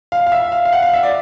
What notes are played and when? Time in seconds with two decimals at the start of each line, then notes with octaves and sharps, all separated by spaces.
0.12 F5
0.26 F5
0.32 E5
0.52 F5
0.65 F5
0.72 F#5
0.82 F5
0.93 E5
1.03 D5